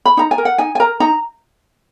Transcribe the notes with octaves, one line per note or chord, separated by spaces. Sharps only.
B5
D#4 A#5
G#5
A#4
F#5
D#4 G#5
G#5
A#4 A#5
D#4 A#5